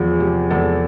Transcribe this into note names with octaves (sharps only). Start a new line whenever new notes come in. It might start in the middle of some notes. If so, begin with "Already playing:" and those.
Already playing: E2 F3 G#4
C3
E2 A4